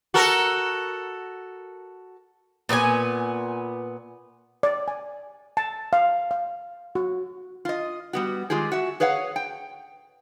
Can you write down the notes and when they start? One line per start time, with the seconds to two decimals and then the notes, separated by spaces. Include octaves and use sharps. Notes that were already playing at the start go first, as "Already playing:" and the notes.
0.14 F#4 A4 A#4
2.69 A#2 B3 F#4 G#5
4.63 D5
4.88 G#5
5.57 A5
5.93 F5
6.31 F5
6.95 F#4
7.65 F4 D#5
8.13 G3 B3 F#4
8.50 D#3 G#3 F4 G4 G#4
8.72 F#4 E5
9.00 G#4 B4 C#5 F5 F#5
9.36 G5